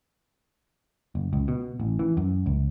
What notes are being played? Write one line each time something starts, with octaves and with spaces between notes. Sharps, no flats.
F#1
C#2
B2
A1
E3
F#2
C#2